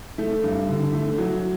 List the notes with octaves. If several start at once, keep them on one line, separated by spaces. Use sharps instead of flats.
A3
G2
D3
A3
F#3